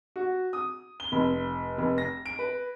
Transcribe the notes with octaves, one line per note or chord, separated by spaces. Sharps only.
F#4
D#6
G7
F1
F1
A#6
D7
B4